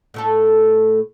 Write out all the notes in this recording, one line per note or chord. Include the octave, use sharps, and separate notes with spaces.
A2 A3 A4